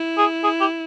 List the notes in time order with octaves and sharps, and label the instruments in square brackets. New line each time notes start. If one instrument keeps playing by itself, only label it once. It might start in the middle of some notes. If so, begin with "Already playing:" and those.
Already playing: [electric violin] E4
[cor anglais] G#4
G#4
G4